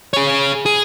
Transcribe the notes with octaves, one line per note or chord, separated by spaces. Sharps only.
G#4 C#5
G#4